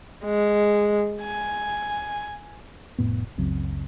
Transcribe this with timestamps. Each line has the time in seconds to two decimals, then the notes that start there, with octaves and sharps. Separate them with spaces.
0.25 G#3
1.23 G#5
2.99 F1 A2 B3
3.38 F#1 C#2 F#3 C4